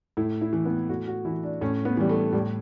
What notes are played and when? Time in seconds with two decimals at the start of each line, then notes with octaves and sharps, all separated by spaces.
0.17 A2 E4
0.41 E4
0.53 E3
0.65 B3
0.89 A2 F#4
1.08 F#4
1.25 E3 E4
1.44 D4
1.61 A2 C#4
1.85 B3
1.97 E3 G3
2.09 A3
2.33 A2 G3